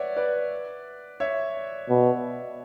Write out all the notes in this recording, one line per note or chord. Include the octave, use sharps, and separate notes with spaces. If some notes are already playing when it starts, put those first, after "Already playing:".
Already playing: B4 C#5 D5 E5 F#5
B4 D5
C#5 E5
B2